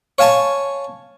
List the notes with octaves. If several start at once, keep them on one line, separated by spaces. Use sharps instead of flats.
C#5 F5 G#5 A5 C#6